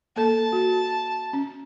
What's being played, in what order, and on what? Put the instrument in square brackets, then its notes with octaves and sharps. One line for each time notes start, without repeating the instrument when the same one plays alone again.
[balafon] A#3 A4 [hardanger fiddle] A5
[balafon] F#4
C#4